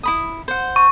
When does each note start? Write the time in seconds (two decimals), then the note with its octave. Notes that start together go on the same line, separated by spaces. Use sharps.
0.03 E4 B5 D#6
0.48 C5 F#5
0.76 C#6